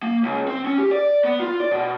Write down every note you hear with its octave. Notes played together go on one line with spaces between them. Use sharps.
A#3
C#2
C4
C#4
G4
D5
B3
F4
D5
B2